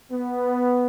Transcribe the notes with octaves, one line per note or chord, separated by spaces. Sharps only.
B3